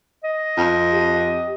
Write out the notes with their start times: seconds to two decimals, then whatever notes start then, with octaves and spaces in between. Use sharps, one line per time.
0.23 D#5
0.57 F2
0.92 G4